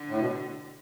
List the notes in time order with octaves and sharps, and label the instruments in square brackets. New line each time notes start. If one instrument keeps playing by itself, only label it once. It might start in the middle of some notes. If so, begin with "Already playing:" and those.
Already playing: [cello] D3
[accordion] A2
B2